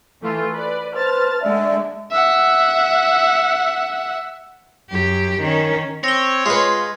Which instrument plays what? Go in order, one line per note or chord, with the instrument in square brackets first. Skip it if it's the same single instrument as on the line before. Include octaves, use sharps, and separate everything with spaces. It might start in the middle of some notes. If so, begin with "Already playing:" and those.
[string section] E3 A3 F4
B4 D5
[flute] B4 [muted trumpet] C5 [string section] A5 F6 A6
[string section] D3 G#3 A3 [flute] D5 [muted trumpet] E5
[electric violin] E5 F#5
[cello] F#2 G4
D#3 C#4
[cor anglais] C4 [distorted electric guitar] C#5 [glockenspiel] A#6 G7
[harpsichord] G#3 B4 [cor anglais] F4